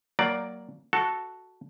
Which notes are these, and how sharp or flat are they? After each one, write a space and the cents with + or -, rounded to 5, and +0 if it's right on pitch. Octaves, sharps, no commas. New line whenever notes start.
F#3 +20 A#3 +0 D5 +0
F#4 +0 A4 +0